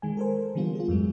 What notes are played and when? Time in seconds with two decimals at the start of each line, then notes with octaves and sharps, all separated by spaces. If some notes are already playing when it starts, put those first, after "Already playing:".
0.02 D#3 G#3 G#5
0.17 A4 A#4 C5
0.55 D3 E3 G3 B3 F4
0.75 F4 G#4
0.88 F2 G#2 F#3 G#3